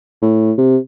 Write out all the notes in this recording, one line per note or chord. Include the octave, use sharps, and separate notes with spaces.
A2
C3